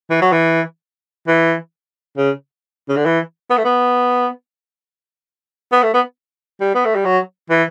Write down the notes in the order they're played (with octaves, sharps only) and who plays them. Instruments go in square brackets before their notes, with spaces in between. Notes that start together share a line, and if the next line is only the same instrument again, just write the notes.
[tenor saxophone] E3
F#3
E3
E3
C#3
C#3
D3
E3
B3
A3
B3
B3
A3
B3
G3
B3
A3
G3
F#3
E3